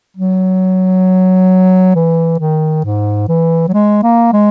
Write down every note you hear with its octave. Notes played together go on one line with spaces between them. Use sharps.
F#3
E3
D#3
G#2
E3
F#3
G#3
A#3
G#3